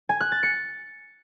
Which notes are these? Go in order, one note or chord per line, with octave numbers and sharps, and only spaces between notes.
G#5
F#6
A6
C#7